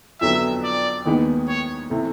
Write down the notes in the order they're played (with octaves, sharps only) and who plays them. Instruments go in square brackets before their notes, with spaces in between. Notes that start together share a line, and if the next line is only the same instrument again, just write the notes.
[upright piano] F2 D3 F#3 B3 [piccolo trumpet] E5
[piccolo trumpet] D5
[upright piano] D#2 D#3 G#3 B3
[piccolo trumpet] C#5
[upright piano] C3 E3 A3